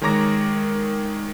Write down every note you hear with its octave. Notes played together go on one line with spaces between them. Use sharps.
D#3 G#3 C#5 A#5 D6 A#6